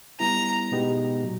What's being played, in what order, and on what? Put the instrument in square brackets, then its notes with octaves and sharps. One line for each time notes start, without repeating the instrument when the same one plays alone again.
[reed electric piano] G3 B3 E4 [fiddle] A#5
[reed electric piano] B2 G#3 B3 D#4 G4
A#2 F#3